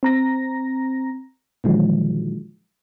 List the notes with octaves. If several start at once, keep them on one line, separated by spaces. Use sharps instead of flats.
C4 A#5 A#6
A#2 D3 D#3 F3 F#3 G#3